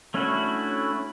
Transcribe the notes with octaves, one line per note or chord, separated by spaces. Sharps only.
A3 C#4 D4 E4 F#4